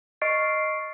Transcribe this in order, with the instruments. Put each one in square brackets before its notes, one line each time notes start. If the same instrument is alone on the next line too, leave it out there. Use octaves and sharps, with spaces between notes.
[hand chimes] D#5 C#6 F6 A6 C7 D7